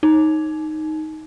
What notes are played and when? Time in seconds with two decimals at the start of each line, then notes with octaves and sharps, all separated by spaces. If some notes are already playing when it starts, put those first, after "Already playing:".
0.03 D#4